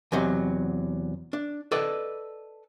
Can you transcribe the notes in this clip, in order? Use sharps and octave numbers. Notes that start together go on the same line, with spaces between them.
E2 C3 F#3 D#5
D4
A4 B4 D5 D#5